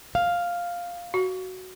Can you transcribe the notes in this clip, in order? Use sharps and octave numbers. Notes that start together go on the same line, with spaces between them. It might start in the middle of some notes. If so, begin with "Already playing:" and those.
F5
F#4